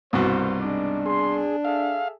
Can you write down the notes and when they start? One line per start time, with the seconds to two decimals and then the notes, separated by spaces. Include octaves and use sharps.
0.13 C2 G2 B2 A#3 C5
0.62 G#3 D4 D#4 D6
1.06 G#4 C6
1.65 G#4 A4 E5 F5